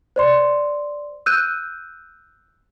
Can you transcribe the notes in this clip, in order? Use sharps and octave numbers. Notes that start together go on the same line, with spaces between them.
C5 D5 C6
E6 F#6 G6 D#7